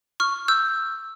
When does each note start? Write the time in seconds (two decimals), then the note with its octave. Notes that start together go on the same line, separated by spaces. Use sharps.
0.20 C#6 F6
0.48 E6 G6